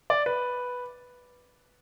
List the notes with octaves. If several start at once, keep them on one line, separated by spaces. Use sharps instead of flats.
D5
B4